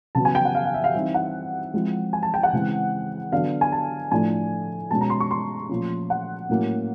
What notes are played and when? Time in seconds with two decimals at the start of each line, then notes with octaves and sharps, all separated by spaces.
0.15 C#3 F#3 B3 A5
0.25 G#5
0.35 G5
0.45 F#5
0.55 F5
0.65 F5
0.74 E5
0.84 F5
0.94 E3 G3 C4 D#4 E5
1.14 F#5
1.74 F3 G#3 C4 E4
2.13 G#5
2.23 A5
2.34 G5
2.43 F#5
2.53 C#3 E3 G#3 C4
3.32 D3 F#3 B3 D4 F5
3.61 G#5
3.72 A5
4.12 A2 F3 A3 D4 G#5
4.91 B2 G#3 C#4 A5
5.01 A#5
5.10 C6
5.20 C#6
5.31 C6
5.69 A#2 F3 A3 C#4
6.10 F#5
6.50 A2 F#3 A#3 C#4 E4